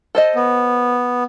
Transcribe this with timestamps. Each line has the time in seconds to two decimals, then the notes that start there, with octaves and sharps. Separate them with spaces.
0.15 A4 C5 D#5
0.35 B3